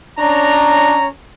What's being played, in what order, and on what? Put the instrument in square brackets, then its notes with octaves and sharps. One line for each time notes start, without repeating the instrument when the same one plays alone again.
[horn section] C#4 C#5 A#5 [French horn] D4